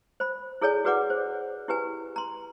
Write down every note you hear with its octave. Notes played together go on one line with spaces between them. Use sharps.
C5 B5
E4 G#4 A4 C#5 D5 G#5
F#4 G#4 B4 D5 F#5 D6
C5
E4 G4 B4 G#5
A#5 C6